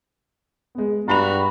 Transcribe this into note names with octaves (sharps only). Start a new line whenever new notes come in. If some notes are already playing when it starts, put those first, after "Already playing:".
G#3 B3
G2 F#4 A#5 B5 F7